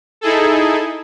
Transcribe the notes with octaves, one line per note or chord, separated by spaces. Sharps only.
D#4 E4 G#4 A4